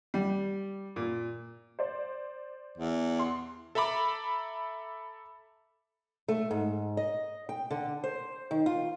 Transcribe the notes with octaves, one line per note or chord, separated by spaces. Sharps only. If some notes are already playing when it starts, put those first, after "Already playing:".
G3
A#2
C5 D5
E2
C6
A4 E5 A#5 B5 D6
A3
G#2
D#5
G5
D3
C5
D#3
F4